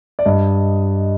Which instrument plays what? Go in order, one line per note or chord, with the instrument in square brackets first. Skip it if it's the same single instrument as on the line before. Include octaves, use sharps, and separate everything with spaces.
[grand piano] D5
G2 D#5